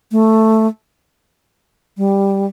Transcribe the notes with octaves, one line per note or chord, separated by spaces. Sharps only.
A3
G3